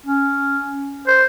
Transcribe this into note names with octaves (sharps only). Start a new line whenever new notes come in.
C#4
C5